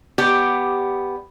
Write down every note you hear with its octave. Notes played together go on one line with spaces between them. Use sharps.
B3 G4 D5